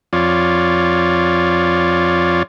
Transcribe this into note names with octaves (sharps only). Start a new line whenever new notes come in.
F2 F4 C#5 D5